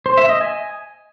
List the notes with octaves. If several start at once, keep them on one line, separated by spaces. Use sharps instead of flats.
C5
E5
D#5
G#5